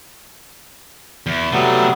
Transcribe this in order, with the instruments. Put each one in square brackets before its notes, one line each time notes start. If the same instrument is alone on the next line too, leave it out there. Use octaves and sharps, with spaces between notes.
[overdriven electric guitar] E2
[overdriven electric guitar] C3 A3 [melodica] F#3 G3 B3